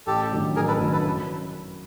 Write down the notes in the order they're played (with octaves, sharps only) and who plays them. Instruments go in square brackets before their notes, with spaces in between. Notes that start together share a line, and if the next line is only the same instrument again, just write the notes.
[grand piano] A1 [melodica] G4 A4
[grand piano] G2 D#3 F#3
[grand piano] A1 [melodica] G#4 A#4
[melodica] A4 B4
[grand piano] G2 D#3 F#3
[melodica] A4 B4
[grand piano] F#2